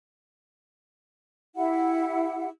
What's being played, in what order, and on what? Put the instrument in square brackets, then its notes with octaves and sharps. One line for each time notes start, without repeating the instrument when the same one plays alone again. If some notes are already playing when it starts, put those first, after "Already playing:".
[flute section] E4 G4 F#5